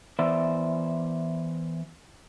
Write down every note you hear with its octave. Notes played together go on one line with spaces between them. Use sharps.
E3 B3 C5 D5 E5